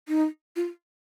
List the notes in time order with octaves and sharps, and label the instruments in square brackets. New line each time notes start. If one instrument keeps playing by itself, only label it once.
[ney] D#4
F4